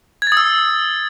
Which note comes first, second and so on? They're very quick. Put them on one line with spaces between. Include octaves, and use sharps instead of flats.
G#6 A6 D#6 E6